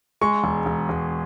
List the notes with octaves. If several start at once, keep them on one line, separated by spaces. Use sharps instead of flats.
G#3 C#6
E1
E1
E1